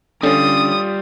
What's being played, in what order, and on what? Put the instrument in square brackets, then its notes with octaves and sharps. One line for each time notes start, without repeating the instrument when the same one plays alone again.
[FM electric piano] D3 C#4 [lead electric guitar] G3 F4 [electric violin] D#6